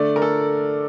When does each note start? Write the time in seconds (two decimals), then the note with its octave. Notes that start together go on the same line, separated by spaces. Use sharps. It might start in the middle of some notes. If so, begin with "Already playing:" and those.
Already playing: D3 A3 D5
0.16 A#4
0.22 A4